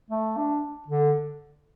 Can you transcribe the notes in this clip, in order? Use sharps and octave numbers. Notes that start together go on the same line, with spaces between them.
A3
D4
D3